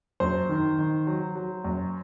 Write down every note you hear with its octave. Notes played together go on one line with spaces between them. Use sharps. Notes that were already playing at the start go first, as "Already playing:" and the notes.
F#2 C5
D#3
D#3
F#3
F#3
F#2